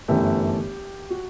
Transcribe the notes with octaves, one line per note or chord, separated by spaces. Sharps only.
G1 F#2 E3 A3 G4
F#4